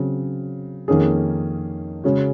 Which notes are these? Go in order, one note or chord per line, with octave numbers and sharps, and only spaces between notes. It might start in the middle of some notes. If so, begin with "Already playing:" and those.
Already playing: C#3 F#3 C4
F2 D#3 A#3 C#4 G#4
C#3 G#3 C#4 F#4